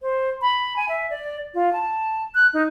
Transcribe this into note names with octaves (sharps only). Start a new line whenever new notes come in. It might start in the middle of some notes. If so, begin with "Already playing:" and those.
C5
B5
G#5
E5
D5
F4
A5
F#6
D#4